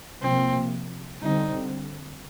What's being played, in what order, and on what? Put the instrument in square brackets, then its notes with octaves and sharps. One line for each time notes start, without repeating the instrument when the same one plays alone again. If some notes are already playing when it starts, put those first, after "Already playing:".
[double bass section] C3 F3 A#3 [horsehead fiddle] C4
[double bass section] D3 G3 C4 [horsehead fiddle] D#4